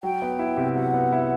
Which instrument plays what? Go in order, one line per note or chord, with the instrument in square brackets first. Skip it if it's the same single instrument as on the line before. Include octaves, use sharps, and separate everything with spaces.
[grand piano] F#3 [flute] G5
[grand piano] B3
E4
C3
[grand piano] F#3 [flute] F#5
[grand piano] B3
E4